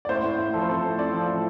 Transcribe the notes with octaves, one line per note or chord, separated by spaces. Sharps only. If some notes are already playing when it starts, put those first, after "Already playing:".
D5
A2 C5
A2
A2
F3 A4
C5
C4 A4
A2
C4 D5
F3
A2